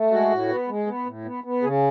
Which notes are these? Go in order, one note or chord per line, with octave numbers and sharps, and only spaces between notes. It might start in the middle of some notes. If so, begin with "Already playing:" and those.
Already playing: A3
G#3 F#4
A2
B3
G#3
B3
A2
B3
B3
C#3 G#4